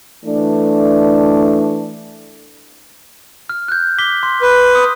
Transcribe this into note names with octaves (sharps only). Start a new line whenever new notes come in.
E3 A3 D4
F6
F#6 G6
D6 B6 G7
C6
B4
D#6